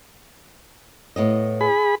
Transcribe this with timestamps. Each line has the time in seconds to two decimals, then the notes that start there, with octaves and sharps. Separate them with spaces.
1.16 A2 B3 D#5
1.61 G#4 B5